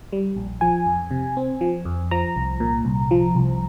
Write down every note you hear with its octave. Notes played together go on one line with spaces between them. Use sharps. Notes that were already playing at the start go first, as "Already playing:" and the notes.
G3
A#1
F3 G#5
F2
C3
C4
F3
F2
F3 A#5
C2
A#2
C2
F3
C2